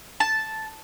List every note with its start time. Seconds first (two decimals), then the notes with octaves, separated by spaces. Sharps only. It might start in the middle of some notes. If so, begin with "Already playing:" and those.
0.20 A5